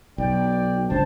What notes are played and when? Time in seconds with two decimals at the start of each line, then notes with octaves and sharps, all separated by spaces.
0.18 B1 D5 G5
0.90 G1 C#2 D4 C5 A5